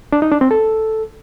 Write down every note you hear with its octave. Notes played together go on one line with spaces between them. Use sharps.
D4
D#4
D4
C4
A4